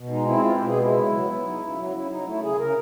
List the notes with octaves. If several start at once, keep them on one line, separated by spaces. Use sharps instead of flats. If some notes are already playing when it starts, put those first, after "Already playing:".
Already playing: B2
G#3 D#4
C4 E4
B2 F4
B2 G4
G#4
G#3 E4
C#3
F#3
B3
D#4
C#3
F#3
C#3 E4
F#3 D#4
A3 E4
C#3 G#4
C#3 A#4